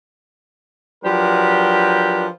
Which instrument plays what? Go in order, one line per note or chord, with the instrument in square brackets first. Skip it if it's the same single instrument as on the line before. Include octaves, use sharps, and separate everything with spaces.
[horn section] F3 F#3 D4 G4 A#4 B4